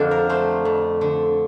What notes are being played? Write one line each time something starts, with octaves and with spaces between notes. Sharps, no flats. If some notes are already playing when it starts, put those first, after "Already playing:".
Already playing: F2 D3 D4 F4
A#4
A3 C5
F2
D3